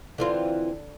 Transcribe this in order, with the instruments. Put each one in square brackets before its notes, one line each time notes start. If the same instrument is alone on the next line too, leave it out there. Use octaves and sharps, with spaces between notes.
[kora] D3 [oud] E3 C4 F4